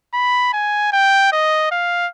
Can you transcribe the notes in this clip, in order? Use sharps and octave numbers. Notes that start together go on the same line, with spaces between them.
B5
G#5
G5
D#5
F5